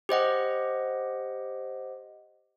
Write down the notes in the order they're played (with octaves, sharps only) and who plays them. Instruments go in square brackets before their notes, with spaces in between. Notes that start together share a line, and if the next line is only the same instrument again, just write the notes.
[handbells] G4 C5 D#5 F#5